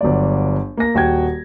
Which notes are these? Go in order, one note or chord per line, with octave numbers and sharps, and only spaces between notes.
G1 F#3 D5
A#3 A#6
D#1 F#4 G5 G#6